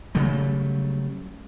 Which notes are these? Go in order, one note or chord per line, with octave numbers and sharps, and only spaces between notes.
C#3 F#3 G3 A3